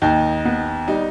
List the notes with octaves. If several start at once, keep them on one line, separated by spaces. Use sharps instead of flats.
D#2 D#4
B3
G3 D#4